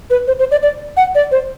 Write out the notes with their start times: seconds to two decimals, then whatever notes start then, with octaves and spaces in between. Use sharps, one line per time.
0.10 B4
0.27 C5
0.39 C5
0.51 D5
0.63 D5
0.97 F#5
1.15 D5
1.32 C5